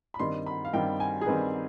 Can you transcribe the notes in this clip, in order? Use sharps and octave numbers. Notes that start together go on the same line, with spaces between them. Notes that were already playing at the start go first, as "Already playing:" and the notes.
B5
G2 D#3 G3 C4 C6
B5
F5
G2 D#3 G3 C4 G5
G#5
G#4
G2 D#3 G3 C4 B4